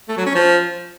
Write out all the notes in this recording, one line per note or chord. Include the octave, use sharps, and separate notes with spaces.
A3
F#3
C#4
F3